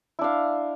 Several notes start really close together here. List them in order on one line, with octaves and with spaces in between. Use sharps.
E4 D4 F5